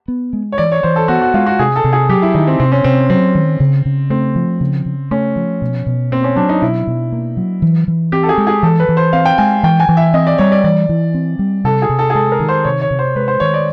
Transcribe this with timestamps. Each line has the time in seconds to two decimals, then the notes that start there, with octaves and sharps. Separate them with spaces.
0.08 B3
0.33 G#3
0.52 C#5
0.58 E3 D5
0.72 C#5
0.83 E3 C5
0.96 A4
1.08 B3 F#4
1.22 F#4
1.34 G#3 F4
1.46 F#4
1.59 C3 G#4
1.76 A4
1.84 C3
1.93 G#4
2.09 F#3 G4
2.22 E4
2.35 D#3 D#4
2.47 C4
2.60 C3 C4
2.72 C#4
2.84 C3 C4
3.10 F#3 C4
3.35 D#3
3.60 C#3
3.86 C#3
4.10 A3 C4
4.36 F3
4.61 C#3
4.86 C#3
5.11 A3 C#4
5.36 F3
5.62 B2
5.87 B2
6.11 A#3 C4
6.24 C#4
6.36 F#3 D4
6.49 D#4
6.62 B2 E4
6.87 B2
7.12 A#3
7.37 F#3
7.62 E3
7.88 E3
8.12 C4 G4
8.23 A4
8.29 G#4
8.38 G#3
8.47 G#4
8.63 E3 A4
8.80 B4
8.89 E3
8.97 C5
9.13 C4 F5
9.26 G5
9.38 G#3 G#5
9.63 E3 G5
9.80 G#5
9.89 E3
9.97 E5
10.14 C4 D#5
10.27 D5
10.38 G3 C#5
10.52 D5
10.64 E3 D5
10.89 E3
11.14 C4
11.39 G3
11.64 C3 A4
11.82 G#4
11.89 C3
11.99 A4
12.10 G#4
12.15 G#3 A4
12.32 A#4
12.40 D#3
12.49 C5
12.65 C3 C#5
12.82 C#5
12.91 C3
12.99 C5
13.16 G#3 B4
13.28 C5
13.40 D#3 C#5
13.54 D5